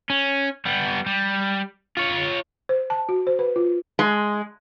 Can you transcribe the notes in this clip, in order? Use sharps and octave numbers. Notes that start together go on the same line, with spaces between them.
C#4
G3 B3
G3
F4 C#5
C5
A5
F#4
C5
B4
F4
G#3